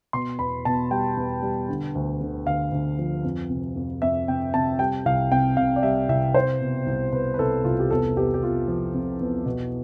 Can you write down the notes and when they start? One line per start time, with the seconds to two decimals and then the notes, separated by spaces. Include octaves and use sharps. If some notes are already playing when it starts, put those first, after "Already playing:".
0.13 B2 C6
0.39 E2 B5
0.65 B2 A5
0.91 G3 G5
1.17 E2
1.42 G3
1.69 D3
1.95 D2
2.21 D3
2.47 D2 F5
2.72 D2
2.99 F3
3.24 F2
3.50 C3
3.76 F2
4.02 F2 E5
4.28 C3 G5
4.54 C3 A5
4.79 G3 G5
5.05 C2 F5
5.31 C3 G5
5.57 C3 F5
5.76 D5
5.83 G3 E5
6.09 C2 E5
6.34 C2 C5
6.60 B2
6.86 C2
7.12 B2 B4
7.34 B4
7.39 C2 A4
7.64 C2 F4
7.79 G4
7.91 E2 A4
8.17 E2 G4
8.34 G4
8.42 E2 F4
8.68 F3
8.94 C3
9.20 E2
9.46 B2